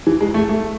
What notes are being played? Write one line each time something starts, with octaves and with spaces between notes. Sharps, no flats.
E3
G#3
A3
A3